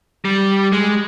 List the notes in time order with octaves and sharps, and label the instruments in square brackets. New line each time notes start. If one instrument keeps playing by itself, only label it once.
[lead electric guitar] G3
G#3